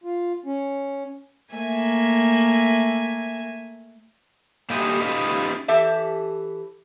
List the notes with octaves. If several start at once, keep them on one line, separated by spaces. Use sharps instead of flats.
F4
C#4
A3 A#3 E5 G#5
A#2 G3 A3 G4 D#5 G#5
C#4 D#4 F4 G4 B4 D#5
E3 G4 A4 E5 A5